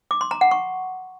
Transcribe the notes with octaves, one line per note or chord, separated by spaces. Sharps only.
D6
C6
A#5
F#5
C#6